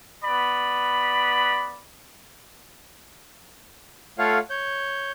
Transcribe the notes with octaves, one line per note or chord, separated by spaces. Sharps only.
B3 D5 B5
A3 F4 A4 C#5 F5 F#5
C#5 G6